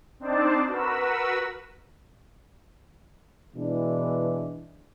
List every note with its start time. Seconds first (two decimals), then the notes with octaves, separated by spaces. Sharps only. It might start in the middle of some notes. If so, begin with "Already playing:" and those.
0.20 C4 D4 D#4 C5 D5 A5
0.68 F#4 A#4 B4 E6
3.54 B2 E3 G#3 D4 E4